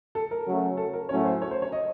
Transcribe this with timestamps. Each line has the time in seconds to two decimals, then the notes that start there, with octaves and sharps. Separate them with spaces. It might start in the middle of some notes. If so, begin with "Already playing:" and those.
0.15 A4
0.31 A#4
0.47 C#3 F#3 A3 C#4
0.77 A4
0.93 A#4
1.09 A2 F#3 A3 C#4 C#5
1.25 C5
1.42 C#5
1.51 C5
1.62 C#5
1.72 D#5